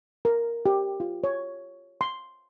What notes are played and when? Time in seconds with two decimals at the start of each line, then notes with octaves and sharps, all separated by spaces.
0.25 A#4
0.66 G4
1.00 F4
1.24 C#5
2.01 C6